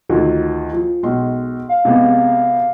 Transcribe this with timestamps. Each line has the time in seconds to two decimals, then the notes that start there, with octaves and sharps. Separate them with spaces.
0.09 D2 D#3 F3
0.73 F3
1.03 B1 G#3 C6
1.69 F5
1.85 C3 G#3 B3